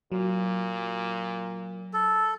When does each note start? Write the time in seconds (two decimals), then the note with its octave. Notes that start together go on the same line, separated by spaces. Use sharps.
0.12 A#2 F#3
1.93 A4